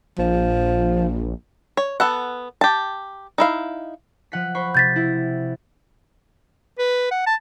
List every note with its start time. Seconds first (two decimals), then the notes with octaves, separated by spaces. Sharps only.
0.19 A#1 F3
1.77 C#5
2.00 B3 A4 F#5
2.61 G4 A5
3.38 D#4 E4 F5
4.32 F3 F#5 B6
4.55 C5 B5 C#6
4.75 C3 G6 A6 B6
4.96 E4
6.79 B4
7.11 F#5
7.27 A5